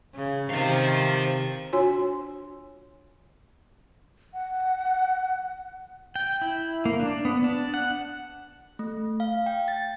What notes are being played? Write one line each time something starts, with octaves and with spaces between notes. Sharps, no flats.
C#3
C3 D#3 C5 F5
D4 F4 F#4 C#5 G#5 C6
F#5
G5
E4
A#3
D4
B3
D4
F#5
A3
F5
G5
A6